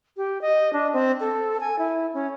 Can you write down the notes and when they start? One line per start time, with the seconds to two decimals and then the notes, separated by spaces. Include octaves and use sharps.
0.17 G4
0.42 D#5
0.73 D4
0.93 C4
1.20 A4
1.60 G#5
1.79 E4
2.14 C#4